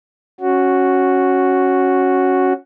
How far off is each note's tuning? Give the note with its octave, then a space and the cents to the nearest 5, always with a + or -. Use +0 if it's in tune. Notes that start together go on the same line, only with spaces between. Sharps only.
C#4 -5 F#4 +0